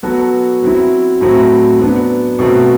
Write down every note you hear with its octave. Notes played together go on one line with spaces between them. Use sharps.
F#3 B3 F#4 A4
F#3 C4 E4
A2 F#3 A3 C4
F#3 B3 D4
B2 F#3 A3 C4